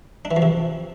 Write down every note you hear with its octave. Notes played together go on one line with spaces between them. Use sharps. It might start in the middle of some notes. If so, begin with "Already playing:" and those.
D4
E3
F3
C3